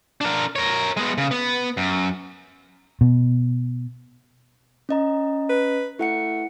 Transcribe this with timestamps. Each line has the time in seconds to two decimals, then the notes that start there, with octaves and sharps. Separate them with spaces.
0.21 D4 A#4
0.56 A#4 C#5
0.97 G#3 B3
1.18 C#3
1.31 B3
1.77 F#2
3.01 B2
4.89 C#4 D#5 A#5
5.50 B4
5.99 A3 E4 F#5 C#7